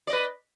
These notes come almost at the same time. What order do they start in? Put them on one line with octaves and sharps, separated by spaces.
D5 D#5 B4